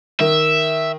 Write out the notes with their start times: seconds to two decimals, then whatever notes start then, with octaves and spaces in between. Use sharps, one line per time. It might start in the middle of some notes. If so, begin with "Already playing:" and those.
0.20 D#3 E5